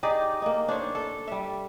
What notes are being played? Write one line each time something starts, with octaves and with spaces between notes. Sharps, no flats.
D#4 G4 G#4 D5
A#3 D#4
D4 C5 C#5
A4
G3 E5